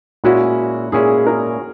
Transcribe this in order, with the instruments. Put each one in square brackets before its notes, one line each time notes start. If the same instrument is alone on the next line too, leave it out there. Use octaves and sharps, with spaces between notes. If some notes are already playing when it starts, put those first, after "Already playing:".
[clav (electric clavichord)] A#2 G#3 C#4 E4 [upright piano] F#4
[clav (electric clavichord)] A#2 G#3 C#4 E4 [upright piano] G#4
[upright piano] A#4